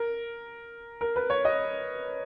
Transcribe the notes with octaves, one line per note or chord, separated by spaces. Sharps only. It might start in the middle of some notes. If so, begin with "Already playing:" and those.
Already playing: A#4
A#4
B4
C#5
D#5